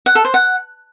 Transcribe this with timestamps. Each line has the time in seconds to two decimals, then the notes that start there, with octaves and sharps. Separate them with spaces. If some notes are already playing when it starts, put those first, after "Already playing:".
0.06 F#5
0.15 A4
0.25 C5
0.34 F#5